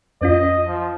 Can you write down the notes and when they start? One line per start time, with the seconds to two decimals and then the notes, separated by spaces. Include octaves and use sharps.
0.21 F2 C#4 F4 D#5
0.67 F3